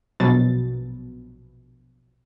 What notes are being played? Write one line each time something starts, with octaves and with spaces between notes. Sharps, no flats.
A#1 B2 F#3 A6